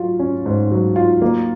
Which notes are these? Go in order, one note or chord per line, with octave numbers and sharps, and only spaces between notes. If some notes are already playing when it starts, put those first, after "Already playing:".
Already playing: F#3 F4
C#4
G#2
F#3
F4
A#3